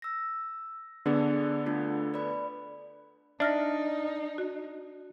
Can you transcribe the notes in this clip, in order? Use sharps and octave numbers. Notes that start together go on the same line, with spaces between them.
E6 A#6
D3 B3 D4 G#4 A4 D5
A3 D4 F4
B4 D5 B5
D4 D#4 E5 F6 A#6
F#4